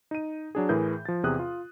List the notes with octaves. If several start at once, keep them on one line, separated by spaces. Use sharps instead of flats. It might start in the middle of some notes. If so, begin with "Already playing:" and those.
D#4 D#7
F#3 D4 G#4
A2 E3 G#4 A#4 G6
F3 A6
E2 C3 G#4 D#6 F#6
F4